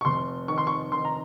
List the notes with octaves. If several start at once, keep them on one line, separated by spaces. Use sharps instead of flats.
C#6
F1 C6
D#3 C#6
C6
C#6
D#3 C6
A#5